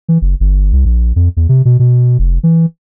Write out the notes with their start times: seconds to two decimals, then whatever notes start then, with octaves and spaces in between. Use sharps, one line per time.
0.09 E3
0.22 F#1
0.40 G1
0.73 C2
0.85 A#1
1.16 F2
1.37 E2
1.49 C3
1.65 B2
1.80 B2
2.19 F1
2.43 E3